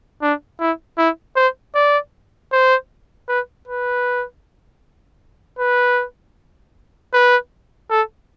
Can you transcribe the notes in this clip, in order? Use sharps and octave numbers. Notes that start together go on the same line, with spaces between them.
D4
E4
E4
C5
D5
C5
B4
B4
B4
B4
A4